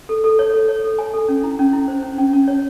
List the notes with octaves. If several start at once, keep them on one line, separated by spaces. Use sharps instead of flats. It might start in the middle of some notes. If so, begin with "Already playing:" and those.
A4
A4
C#5
A4
C#5
A4
G#5
A4
C#4
E4
C#4
E4
C5
C#4
C#4
C#4
C#5